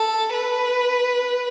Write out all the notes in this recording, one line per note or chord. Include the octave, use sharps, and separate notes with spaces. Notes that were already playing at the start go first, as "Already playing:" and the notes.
Already playing: A4
B4